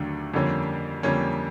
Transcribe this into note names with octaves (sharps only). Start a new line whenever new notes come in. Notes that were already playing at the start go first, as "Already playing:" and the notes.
Already playing: D#2 D3 F#3 A3 D4
F2 D3 G3 A#3 C#4
F2 D3 G3 A#3 C#4